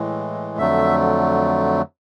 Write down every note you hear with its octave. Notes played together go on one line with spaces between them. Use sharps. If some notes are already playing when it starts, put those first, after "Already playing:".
Already playing: A2 E3 G#3
F2 D3 F#3 A3 E5